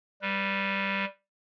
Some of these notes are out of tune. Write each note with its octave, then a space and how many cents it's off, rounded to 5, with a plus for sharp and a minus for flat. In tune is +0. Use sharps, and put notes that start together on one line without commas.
G3 +0 B4 +0